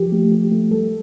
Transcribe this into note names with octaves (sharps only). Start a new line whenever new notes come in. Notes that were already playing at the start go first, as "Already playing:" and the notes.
Already playing: F3 G4
A3
F3 G4
A3
G3 A4